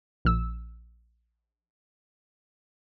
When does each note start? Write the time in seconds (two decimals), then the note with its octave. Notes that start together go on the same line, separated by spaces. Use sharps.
0.25 A#1 E6